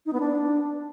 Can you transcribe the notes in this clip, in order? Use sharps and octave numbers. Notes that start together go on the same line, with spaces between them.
D#4
B3
D4